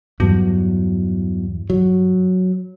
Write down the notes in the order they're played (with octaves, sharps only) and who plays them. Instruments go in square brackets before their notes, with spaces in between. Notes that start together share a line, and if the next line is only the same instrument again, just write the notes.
[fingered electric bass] E2 F#3 [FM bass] G2
[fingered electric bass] F#3